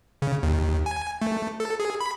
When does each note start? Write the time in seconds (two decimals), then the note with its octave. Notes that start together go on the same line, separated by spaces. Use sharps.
0.22 C#3
0.43 D#2
0.86 G#5
1.22 A3
1.60 A4
1.80 G#4
2.00 B5